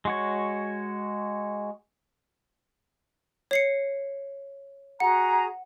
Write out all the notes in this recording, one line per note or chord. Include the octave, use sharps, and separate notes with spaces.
G#3 F#4 C#5
C#5 C7 C#7
F#4 G#4 F#5 A#5